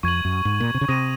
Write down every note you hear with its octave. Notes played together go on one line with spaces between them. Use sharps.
F2 C#6 G#6 D#7 F#7
F#2
G#2
A#2
C3
C#3
C3 D#6 A#6 D#7